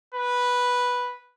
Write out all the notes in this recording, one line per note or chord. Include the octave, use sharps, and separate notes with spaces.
B4